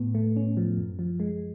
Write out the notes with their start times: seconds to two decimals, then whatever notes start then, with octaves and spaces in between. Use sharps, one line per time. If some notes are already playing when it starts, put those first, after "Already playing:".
Already playing: A2 B3
0.15 A3
0.36 C#4
0.57 F3
0.78 F#2
0.99 F3
1.20 G#3